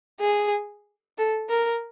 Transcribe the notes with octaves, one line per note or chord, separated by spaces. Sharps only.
G#4
A4
A#4